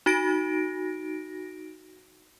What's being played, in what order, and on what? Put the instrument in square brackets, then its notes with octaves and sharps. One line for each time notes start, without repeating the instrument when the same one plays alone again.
[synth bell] D#4 F#4 A#6 D7